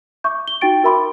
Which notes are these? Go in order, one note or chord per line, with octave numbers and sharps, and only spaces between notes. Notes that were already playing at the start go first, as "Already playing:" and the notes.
E5 C#6 D6 G6
G7
D#4 F#4 G5 A6 D7
F#4 A#4 E5 B5 C6 D6